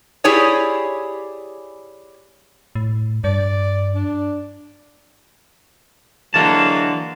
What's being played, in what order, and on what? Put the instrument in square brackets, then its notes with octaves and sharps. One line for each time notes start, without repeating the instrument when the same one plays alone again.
[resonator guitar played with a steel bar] E4 G4 G#4 C#5 D5
[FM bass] A2
[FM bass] G2 [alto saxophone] D5
[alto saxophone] D4
[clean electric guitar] D3 E3 A5 [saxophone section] F#3 G#3 A#3